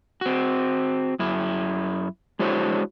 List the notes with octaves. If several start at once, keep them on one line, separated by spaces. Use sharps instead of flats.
C4 F#4
F#2 E4
G#3 D4 E4 F#4 C5 C#5